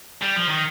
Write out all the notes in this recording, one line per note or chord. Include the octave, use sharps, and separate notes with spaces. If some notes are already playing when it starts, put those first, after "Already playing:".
G3
F3
D#3